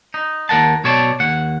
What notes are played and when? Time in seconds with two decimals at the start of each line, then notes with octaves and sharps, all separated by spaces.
0.14 D#4
0.49 D#2 A#4 F#5 A5
0.84 B1 B2 C#5 D5 A5
1.20 D#2 F#5